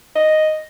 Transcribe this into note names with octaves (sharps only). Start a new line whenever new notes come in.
D#5